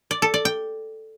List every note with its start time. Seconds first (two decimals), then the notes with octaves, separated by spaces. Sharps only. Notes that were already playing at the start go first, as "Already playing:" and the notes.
0.11 D5
0.22 A4
0.34 D5
0.45 G5